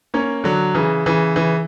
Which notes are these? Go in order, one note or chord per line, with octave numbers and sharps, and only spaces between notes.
A#3 C#4
D3 F#3
C#3 E3
C#3 E3
C#3 E3